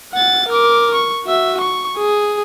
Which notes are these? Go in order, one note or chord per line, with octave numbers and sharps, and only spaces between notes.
F#5 A6
A#4 D6
C#6
F#4 E5
C#6
G#4